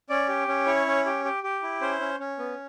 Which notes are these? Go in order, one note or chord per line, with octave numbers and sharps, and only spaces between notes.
C#4 D5
G4
C#4
E4 C#5
C#4
G4
G4
G4
E4
C#4 C5
C#4
C#4
B3